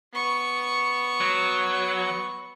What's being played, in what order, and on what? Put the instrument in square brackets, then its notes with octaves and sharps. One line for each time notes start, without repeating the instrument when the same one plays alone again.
[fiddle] B3 C#6
[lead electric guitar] F#3